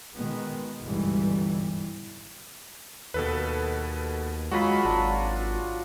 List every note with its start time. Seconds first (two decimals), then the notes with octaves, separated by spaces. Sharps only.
0.14 B2 D#3 G#3 B3
0.81 G1 C#2 G#2 B2 E3 G3
3.14 D#2 B2 A4 B4
4.51 F#3 G#3 F4 F#4 B5
4.85 G#1 D4